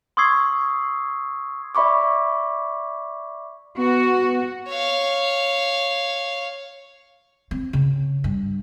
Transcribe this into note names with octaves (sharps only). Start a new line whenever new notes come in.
C6 C#6 D#6 E6 G#6 C7
D5 E5 B5 C#6 D6
B3 F#4
C#5 F5
C4
C#3
G2